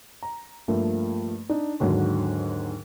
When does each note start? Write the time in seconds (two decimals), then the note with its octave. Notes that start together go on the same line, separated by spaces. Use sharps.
0.23 A#5
0.68 G2 F3 A3 A#3
1.49 D4 D#4
1.80 D#2 G#2 D3 F#3